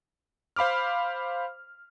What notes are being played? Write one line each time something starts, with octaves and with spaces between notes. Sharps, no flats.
C5 F5 B5 D6 F6